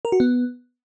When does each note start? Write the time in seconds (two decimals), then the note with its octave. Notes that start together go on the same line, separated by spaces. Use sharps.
0.05 A#4
0.12 F#4
0.20 B3